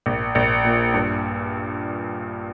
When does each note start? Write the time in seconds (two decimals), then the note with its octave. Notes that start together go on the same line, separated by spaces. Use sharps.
0.06 A#1
0.35 A#1
0.64 A#2
0.94 G2